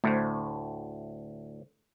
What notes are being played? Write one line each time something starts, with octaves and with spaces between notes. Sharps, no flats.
D2 A2 A3 C5